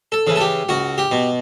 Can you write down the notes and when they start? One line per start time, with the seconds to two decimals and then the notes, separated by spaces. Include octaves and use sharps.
0.12 A4
0.27 C#3 E3
0.36 A4
0.40 G4
0.69 C#2 F#4
0.98 G4
1.11 B2